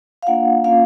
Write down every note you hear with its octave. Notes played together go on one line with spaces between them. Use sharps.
F5
A#3 D4 F4 F#5
A#3 C#4 F4 F5